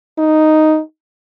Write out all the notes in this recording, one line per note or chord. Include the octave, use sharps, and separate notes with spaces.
D#4